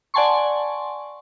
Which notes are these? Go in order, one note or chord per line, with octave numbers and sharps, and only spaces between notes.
D5 F#5 G#5 A5 C6 C#6